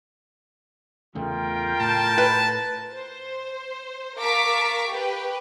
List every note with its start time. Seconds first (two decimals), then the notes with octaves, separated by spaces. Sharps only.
1.15 E2 C#3 A3 F4 A#4 G5
1.80 A2 A5
2.18 B4
2.94 C5
4.18 A#4 F5 A5 C#6 D6 B6
4.90 G4 B4 G5